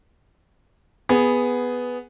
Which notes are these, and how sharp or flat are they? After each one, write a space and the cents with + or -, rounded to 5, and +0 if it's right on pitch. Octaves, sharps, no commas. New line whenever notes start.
B3 +0 G#4 +0